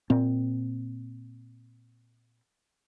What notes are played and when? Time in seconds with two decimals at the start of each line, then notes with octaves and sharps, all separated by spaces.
0.10 A#2 C4